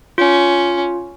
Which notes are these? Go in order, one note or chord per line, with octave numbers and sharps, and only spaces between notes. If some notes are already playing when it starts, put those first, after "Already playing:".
C#4 F4